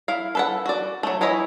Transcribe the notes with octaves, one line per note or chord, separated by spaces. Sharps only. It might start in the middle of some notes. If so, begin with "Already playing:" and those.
E4 F5
A4 B4 F#5
F#4 D5
F#3 A3
E3 E4 C#5 D#5 B5